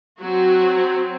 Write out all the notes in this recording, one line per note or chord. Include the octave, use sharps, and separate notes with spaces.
F#3 C4 F#4